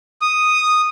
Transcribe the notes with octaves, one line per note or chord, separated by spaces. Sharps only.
D#6